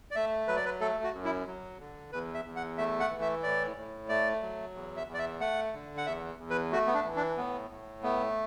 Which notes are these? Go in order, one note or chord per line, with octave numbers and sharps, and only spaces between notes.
D5
A3 E5
F#3 B4
D5
B4
A3 A4
F#4
F#2
E4
F#3
D3
E2 B4
E5
E2
F#5
A3 E5
F#5
E3
E5
A2 D5
A2
A3 D5
F#3
E2
E5
E2
D5
E5
A3 F#5
D3
F#5
E2 E5
E2
B4
A3 F#4
B3
D4
E3
D4
A2 B3
A2
A3 B3